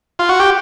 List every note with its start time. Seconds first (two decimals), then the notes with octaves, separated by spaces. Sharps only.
0.19 F4
0.29 F#4
0.40 G4